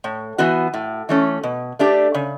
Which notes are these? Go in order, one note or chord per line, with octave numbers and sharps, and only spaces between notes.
A2
E3 B3 F#4
A2
E3 A3 C#4
B2
A3 D4 G4
C#3